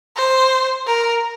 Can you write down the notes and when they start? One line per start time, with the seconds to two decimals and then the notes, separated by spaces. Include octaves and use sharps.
0.16 C5
0.87 A#4